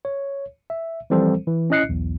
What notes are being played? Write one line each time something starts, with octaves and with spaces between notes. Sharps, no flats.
C#5
E5
E3 F3 G3 C4 A4 C5
E3
C#4 E4 D#5 F#6 C7 C#7
B1 E2